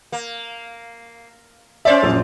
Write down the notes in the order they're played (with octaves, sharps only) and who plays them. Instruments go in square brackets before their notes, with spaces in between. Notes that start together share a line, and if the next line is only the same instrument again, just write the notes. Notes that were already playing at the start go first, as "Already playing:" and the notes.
[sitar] A#3
[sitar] C#4 C5 D5 [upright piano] E5
[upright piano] A#1 F#2